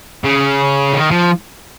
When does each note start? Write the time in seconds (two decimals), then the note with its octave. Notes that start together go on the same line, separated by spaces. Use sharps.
0.24 C#3
0.94 D#3
1.11 F3